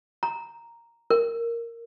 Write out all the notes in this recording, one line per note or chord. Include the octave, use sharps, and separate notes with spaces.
A#5
A#4